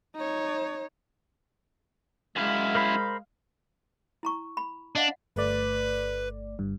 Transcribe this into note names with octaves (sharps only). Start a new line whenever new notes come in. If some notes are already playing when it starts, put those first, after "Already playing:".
D#4 C#5
F#2 G#3 E4 F5
A#4 C5 B5
E4 A#5 C#6
B5
D4 D#5 F5 F#5
G1 A3 B4 D5
G1 G2